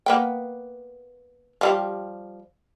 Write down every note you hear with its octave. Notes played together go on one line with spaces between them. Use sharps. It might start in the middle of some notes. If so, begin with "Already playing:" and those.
A#3 B3 G5
F3 G3 G4